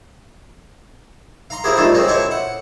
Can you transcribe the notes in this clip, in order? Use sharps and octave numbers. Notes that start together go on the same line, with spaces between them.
F5 A#5 C6
A#3 C4 E4 G4 G#4 A#4
D#3 G3 A3 C4 D4 F4
B2 G#3 A#3 C4 C#4
E4 A4 C5 C#5
F#5